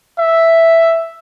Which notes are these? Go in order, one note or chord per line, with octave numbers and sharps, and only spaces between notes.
E5